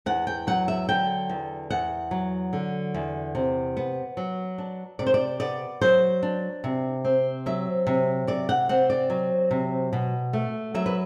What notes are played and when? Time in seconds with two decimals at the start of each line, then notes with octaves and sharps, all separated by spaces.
0.06 E2 F#5
0.27 G5
0.47 F#3 F#5
0.68 E5
0.89 D3 G5
1.29 E2
1.70 E2 F#5
2.11 F#3
2.53 D3
2.94 E2
3.35 C3
3.77 B3
4.17 F#3
4.58 D4
4.99 C3 D5
5.06 C5
5.14 D5
5.40 B3 D5
5.81 F#3 C5
6.23 D4
6.64 C3
7.05 C4
7.46 F#3 E5
7.87 C3
8.27 C3 D5
8.49 F#5
8.69 C4 F#5
8.90 D5
9.10 F#3
9.51 C3
9.93 B2
10.33 A3
10.74 F#3 E5
10.86 B4